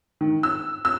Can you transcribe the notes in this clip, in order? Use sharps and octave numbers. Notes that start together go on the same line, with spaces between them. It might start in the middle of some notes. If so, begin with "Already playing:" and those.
D#3
E6
E6